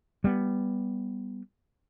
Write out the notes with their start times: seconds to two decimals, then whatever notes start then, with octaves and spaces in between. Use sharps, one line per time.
0.24 G3 B3